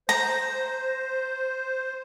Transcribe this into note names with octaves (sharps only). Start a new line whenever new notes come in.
C5 A#5